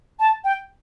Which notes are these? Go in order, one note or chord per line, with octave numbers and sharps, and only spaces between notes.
A5
G5